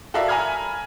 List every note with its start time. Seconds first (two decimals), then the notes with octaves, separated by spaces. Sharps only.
0.14 F#4 A4 A#4 D5 E5 F5
0.28 G#5 A#5 B5 F6 G#6